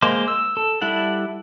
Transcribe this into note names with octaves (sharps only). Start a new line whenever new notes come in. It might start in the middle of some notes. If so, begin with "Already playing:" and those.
G#3 A#3 C5 D6
E6
A4
G3 E4 A4 F#5